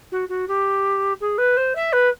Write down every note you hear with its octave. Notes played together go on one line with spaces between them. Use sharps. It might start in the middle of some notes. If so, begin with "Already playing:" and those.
F#4
F#4
G4
G#4
B4
C5
E5
B4